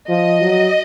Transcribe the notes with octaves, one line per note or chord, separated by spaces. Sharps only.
F3 D#5
F#3